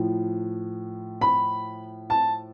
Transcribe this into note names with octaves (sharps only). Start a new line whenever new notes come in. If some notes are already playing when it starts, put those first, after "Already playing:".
Already playing: A2 F3
B5
A5